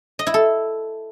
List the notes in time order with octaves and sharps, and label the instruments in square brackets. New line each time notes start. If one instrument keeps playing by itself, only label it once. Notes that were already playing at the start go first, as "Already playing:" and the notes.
[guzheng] D#5
E4
A4